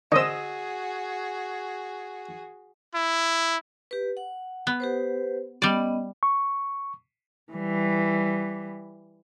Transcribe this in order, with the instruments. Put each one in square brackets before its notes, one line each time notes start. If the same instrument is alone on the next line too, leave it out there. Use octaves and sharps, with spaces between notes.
[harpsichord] D3 C4 [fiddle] F#4 G#4 [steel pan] D#5 D#6 E6
[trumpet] E4
[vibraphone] G4 B4
F#5
[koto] B3
[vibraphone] G4 B4 C5
[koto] G3 D5 [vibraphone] B3 C#4 D#5
[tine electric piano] C#6
[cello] E3 G3